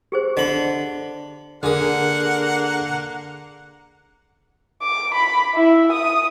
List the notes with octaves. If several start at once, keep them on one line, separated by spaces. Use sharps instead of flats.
G4 G#4 C5
D3 D#5 B5
D3 A#3 D4 G#4 A#4 F#5 D#6
D6
B5
E4
D#6